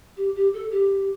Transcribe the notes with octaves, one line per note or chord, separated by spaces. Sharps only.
G4
G4
A4
G4